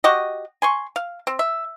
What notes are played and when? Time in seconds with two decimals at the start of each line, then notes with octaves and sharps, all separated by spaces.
0.04 F#4 G4 D#5
0.62 G#5 C6 C#6
0.96 F5
1.27 C4
1.39 E5